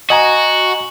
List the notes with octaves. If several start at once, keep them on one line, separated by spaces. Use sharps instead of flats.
F#4 D#5 G#5 A#5